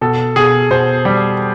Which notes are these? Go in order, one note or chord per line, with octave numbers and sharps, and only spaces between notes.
B2 A4
B2 G#4
B2 C5
G3